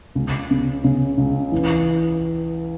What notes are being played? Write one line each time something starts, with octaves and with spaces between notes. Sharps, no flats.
C#2
C#3
C#3
C#2
E3